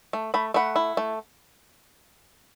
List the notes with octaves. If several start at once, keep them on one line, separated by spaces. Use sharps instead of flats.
A3
A3 B5
A3 F#5 B5
E4
A3